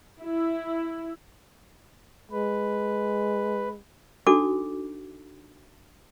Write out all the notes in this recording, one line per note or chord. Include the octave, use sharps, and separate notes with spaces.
E4
G#3 B4
D4 D#4 F#4 A4 D6